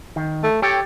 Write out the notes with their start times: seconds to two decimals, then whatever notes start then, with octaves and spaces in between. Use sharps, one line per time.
0.16 D#3
0.43 A3
0.62 G4 A4 C#5 G5